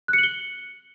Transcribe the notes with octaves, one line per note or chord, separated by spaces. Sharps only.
F#6
C#7
F#7
G7